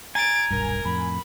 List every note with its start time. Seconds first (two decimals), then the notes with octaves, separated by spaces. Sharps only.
0.15 G#5 A#5 A6 D7
0.51 D#1 B1 G2 A#4
0.85 F2 A2 B5